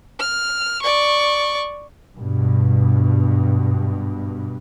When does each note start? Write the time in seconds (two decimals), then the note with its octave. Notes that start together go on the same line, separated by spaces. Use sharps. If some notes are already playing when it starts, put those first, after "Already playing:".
0.19 F6
0.82 D5 C#6
2.16 G2 B2